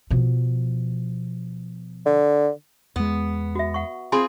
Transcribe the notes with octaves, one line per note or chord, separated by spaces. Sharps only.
B2 F3
D3
E2 G#3 B3
F#4 E5
F#5 C#6
C4 F4 G#4 G#5 B5 C6